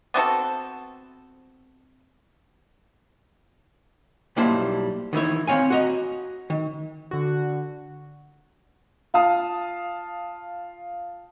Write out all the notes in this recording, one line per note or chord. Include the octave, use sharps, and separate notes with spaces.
B3 C4 F#4 A4
B1 G3 A#3 E4 C5 A5
D#3 E3 E4 C#5
C4 C#5 F5 G#5
F#4 D#5 A#5
D#3
D3 F#4
F4 F5 A5 D#6